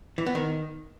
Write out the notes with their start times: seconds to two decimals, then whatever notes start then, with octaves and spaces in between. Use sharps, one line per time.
0.18 E3
0.26 B3
0.35 D#3